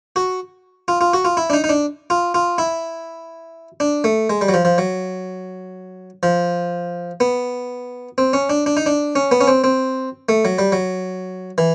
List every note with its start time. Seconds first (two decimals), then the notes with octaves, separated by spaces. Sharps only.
0.16 F#4
0.88 F4
1.01 F4
1.13 F#4
1.25 F4
1.37 E4
1.50 D4
1.53 D#4
1.64 D#4
1.69 D4
2.10 F4
2.34 F4
2.58 E4
3.80 D4
4.04 A3
4.30 G#3
4.41 G3
4.48 F#3
4.54 F3
4.65 F3
4.78 F#3
6.23 F3
7.20 B3
8.18 C4
8.33 C#4
8.50 D4
8.66 D4
8.77 D#4
8.86 D4
9.16 C#4
9.31 B3
9.41 C#4
9.48 C4
9.64 C4
10.29 A3
10.45 F#3
10.58 G3
10.72 F#3
11.58 E3